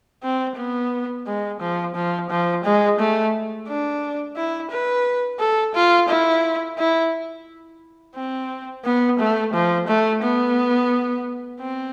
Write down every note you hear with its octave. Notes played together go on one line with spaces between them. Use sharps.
C4
B3
G#3
F3
F3
F3
G#3
A3
D4
E4
B4
A4
F4
E4
E4
C4
B3
A3
F3
A3
B3
C4